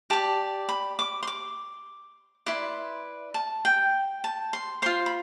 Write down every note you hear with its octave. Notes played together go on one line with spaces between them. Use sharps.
G4 D5 A5
B5
D6
C6
D6
E4 B4 D5 C6
A5
G5
A5
C6
F4 C5 C6
B5